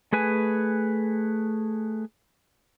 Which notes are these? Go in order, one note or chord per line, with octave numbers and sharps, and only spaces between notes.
A3 G#4 B4 G#5